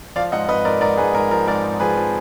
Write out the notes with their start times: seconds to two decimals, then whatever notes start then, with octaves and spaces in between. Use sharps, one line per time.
0.16 F3 D5 F5
0.32 G#2 D#5 F#5
0.48 G#2 B4 D#5
0.65 G#2 A#4 D5
0.81 G#2 A#4 D5
0.97 G#2 G#4 B4
1.14 G#2 A#4
1.31 F3 A#4
1.47 G#2 A#4 D5
1.64 G#2
1.80 F3 G#4 B4
1.97 F3